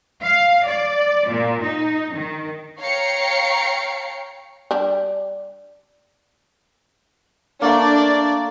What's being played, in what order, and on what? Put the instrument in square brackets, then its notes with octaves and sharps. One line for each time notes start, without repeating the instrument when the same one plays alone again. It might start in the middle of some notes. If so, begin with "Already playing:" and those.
[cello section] F5
D5
A#2
D#4
D#3
[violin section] C#5 F5 G5 A#5 C7 C#7
[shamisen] G3 D4
[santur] A3 A#3 [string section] D4 [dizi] D5